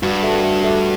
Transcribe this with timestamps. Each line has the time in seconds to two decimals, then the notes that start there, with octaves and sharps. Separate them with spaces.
0.03 G2 F#4
0.23 A3
0.43 A3
0.64 A3